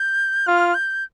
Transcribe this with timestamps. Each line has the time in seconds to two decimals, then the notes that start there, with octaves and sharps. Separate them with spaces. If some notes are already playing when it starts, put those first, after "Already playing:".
Already playing: G6
0.47 F4 F6
0.75 G6